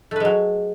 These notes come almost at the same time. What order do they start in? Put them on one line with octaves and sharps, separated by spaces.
A3 B4 G#3 F#3